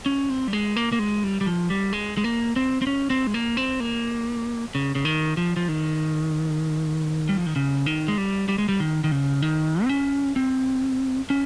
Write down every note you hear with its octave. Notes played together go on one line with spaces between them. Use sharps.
C#4
C4
G3
G#3
A#3
A#3
G#3
G3
G3
F3
G3
G#3
G#3
A#3
C4
C4
C#4
C4
G#3
A#3
C4
A#3
C#3
C#3
D#3
F3
F3
D#3
G3
F3
D#3
C#3
D#3
G#3
G3
G3
G#3
G3
D#3
D#3
C#3
D#3
C4
C#4
C4
C#4